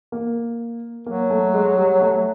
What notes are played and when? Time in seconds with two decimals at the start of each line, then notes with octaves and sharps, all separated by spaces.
0.12 A#3
1.06 F#3 A#3
1.30 A3
1.54 G#3
1.77 G3
2.01 A3